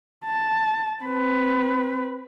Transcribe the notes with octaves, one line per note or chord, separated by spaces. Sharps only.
A5
C4 B4